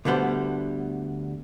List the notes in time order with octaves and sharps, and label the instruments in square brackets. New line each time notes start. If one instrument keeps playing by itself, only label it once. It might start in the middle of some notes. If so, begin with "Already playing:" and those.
[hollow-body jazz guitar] D2 D3 G3 B3 C5